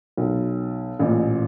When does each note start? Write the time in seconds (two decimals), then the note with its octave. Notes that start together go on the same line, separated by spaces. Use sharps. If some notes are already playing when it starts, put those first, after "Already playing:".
0.17 B1
0.99 A1 A#2